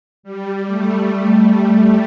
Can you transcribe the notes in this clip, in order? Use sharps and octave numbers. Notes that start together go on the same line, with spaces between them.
G3
A3
A3
G3